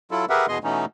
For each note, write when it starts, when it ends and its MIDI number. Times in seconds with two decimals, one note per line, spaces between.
0.11 0.25 54
0.11 0.25 64
0.11 0.25 65
0.11 0.25 69
0.29 0.46 67
0.29 0.46 68
0.29 0.46 70
0.29 0.46 71
0.29 0.46 76
0.29 0.46 78
0.48 0.58 40
0.48 0.58 47
0.48 0.58 59
0.48 0.58 68
0.48 0.58 75
0.48 0.58 84
0.64 0.85 47
0.64 0.85 52
0.64 0.85 57
0.64 0.85 59
0.64 0.85 61
0.64 0.85 63